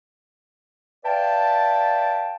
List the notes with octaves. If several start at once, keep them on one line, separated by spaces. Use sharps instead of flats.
B4 D5 E5 F5 G5 A5